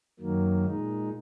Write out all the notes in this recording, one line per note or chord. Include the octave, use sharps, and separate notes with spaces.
F#2 D#3 F#3 A#3
A#2 G#3 D#4